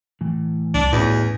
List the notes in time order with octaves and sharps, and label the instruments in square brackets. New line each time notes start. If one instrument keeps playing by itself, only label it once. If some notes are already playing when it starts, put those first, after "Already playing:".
[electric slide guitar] A2 E3
[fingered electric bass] C2 [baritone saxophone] D4
[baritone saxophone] E2 [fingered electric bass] A2 C#4 [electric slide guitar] E4 F#4 D#5
[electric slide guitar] G#5